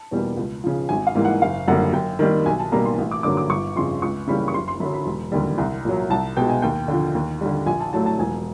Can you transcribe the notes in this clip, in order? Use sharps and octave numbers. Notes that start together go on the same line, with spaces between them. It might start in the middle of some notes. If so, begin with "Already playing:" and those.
Already playing: A5
E2 B2 G3 A#3
C#2
C#3 F3
G#1 G#5
F5
G#2 E3 G3 A#3
F#5
F#1 F5
F#2 D3 G3 A#3 F#5
F#2 G5
D#3 G3 A#3
B1 G#5
A5
B2 G3 A#3 A#5
C6
A1
D6
G2 D3 F#3 A#3 D6
D6
G1 C#6
F2 C#3 C6
C#2 C#6
C#3 E3 G3 A#3 B5
C#6
F#1 C6
C6
F#2 D3 F#3 B5
B5
E1
D#2 D3 G3
C2
A#2 F#3
C2 A5
B2 G#3 G5
G#5
D#2 G5
D3 F3
D#2
D3 G3
A#1 G#5
A5
A2 F#3 A3 A5
A5
E1 G#5